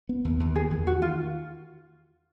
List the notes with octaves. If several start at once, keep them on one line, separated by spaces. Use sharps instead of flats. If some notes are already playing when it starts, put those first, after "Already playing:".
B3
D#2
D#2
D#3 G#4
E2
D#3 F#4
F4